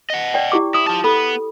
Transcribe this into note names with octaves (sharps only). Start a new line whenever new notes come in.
D#5 F#5
D5 G5
E4 G4 D6
E4 D#6
F4 A5
B3 A4 B5